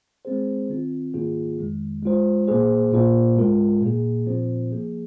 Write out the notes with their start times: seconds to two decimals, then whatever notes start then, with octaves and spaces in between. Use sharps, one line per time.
0.25 G#3 C4 G#4 C5
0.69 D#3 C4 F4
1.14 G#2 D#3 A#3 F4 G#4
1.59 F2 D#3 G#3
2.03 G#3 F4 C5
2.47 A#2 A#3 G#4 C5
2.92 A#2 A#3 F4 C5
3.37 G#2 G#3 F4 A#4
3.82 A#2 A#3 G#4
4.26 A#2 F3 C4 F4 C5
4.71 F3 A#3 G#4